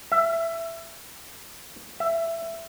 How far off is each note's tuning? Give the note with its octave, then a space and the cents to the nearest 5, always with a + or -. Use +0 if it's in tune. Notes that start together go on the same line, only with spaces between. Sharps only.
E5 +15
E5 +15